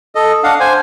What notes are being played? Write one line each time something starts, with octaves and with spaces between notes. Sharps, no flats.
A4 D#5
D4 F5 F#5
C5 G#5